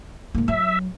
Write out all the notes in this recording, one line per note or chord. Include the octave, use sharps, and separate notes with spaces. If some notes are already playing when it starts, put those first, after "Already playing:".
G#2 A#3
F#3 E5